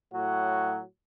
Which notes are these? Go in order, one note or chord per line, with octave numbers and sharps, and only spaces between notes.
A2 F#3 F#4